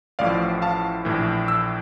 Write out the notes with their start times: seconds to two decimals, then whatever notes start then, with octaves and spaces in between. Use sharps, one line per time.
0.19 A1 A2 F3 D5 F5
0.62 F5 A5
1.05 A#1 A2 E3
1.48 E6